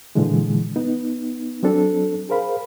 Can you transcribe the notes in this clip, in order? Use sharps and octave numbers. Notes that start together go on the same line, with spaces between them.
A#2 D3 E3 F3 G#3
B3 D#4
F#3 C4 D4 A4
G#4 A#4 C5 F5 B5